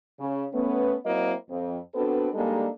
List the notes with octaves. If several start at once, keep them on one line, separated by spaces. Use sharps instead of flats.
C#3
A3 B3 C#4
F#3 A#3 C4 E4 D#5
F2
B3 C4 D4 F#4 A4 B4
G3 G#3 A#3 D4 D#4 A4